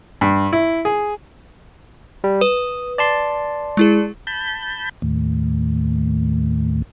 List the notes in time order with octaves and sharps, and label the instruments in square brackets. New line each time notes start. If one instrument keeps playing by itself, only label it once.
[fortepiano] G2
E4
G#4
[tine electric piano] G3
[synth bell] B4 [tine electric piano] D#6
[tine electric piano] D5 A5 C6
[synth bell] G#3 E4 G#4
[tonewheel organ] A5 B5 G6
D#2 A2